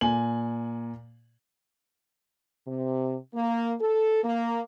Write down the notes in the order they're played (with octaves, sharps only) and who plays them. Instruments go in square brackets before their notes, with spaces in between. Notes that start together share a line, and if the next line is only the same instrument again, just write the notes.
[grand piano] A#2 G#5 F#7
[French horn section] C3
A#3
A4
A#3